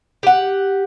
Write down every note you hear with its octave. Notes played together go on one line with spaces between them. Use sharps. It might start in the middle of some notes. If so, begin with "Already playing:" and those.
G4 F#5